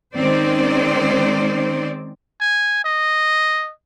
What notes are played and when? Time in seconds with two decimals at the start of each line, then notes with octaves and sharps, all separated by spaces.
0.15 D#3 G#3 C4 C#4 C5 D5
2.41 G#5
2.85 D#5